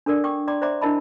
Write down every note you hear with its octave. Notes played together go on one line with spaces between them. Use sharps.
D4 A4 A#4 D5
G5 C#6 D6
D5 G5 A#5 C6 D6
C5 D5 E5 A#5 C6 D6
D4 E4 A#4 D#5 A5 B5